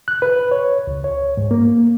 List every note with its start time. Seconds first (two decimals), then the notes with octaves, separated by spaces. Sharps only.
0.08 F#6
0.22 B4
0.51 C#5
0.87 C#2
1.04 C#5
1.37 G#2
1.51 A#3